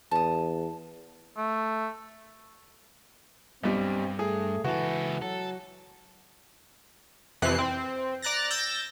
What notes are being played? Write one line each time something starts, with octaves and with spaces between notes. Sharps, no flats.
E2 A5 D#6
A3
B1 G2 G3 C4
A3 G#4
C#2 E3 F#4 A4
F#3 A4
F2 C3 E3 F#6 C7
C4
D5 A#5 F#6 A6 A#6
E6 G6 A6 A#6